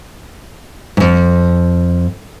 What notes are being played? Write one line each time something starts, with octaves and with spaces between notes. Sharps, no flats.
F2 G#2